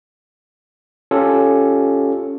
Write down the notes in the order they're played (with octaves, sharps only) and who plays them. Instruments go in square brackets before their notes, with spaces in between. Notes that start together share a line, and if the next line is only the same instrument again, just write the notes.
[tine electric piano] C#4 F4 G4 A4